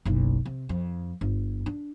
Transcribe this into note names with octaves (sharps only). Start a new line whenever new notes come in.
F#1 B1
C3
F2
G1
D4